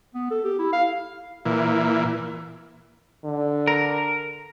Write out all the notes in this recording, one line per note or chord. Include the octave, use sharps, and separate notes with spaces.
B3
A4
G4
E4
F5
A#2 E3
D3
A#4